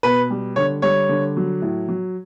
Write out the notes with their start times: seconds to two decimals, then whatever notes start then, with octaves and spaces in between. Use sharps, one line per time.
0.03 B2 B4
0.30 G3
0.56 D3 C#5
0.82 G3 C#5
1.09 D3
1.37 F#3
1.62 A2
1.88 F#3